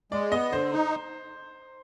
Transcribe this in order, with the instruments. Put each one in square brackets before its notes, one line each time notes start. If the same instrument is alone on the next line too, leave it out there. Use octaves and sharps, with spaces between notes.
[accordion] G#3 [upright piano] D5
[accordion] B3 [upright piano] D#5
[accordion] D3 [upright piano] C5
[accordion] D#4